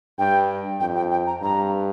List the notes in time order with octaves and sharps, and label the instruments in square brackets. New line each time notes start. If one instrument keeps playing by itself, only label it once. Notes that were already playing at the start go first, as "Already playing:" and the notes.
[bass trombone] G2 [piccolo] G5
[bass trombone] F2 [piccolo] G5
[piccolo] G5
G5
A#5
[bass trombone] G2 [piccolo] A#5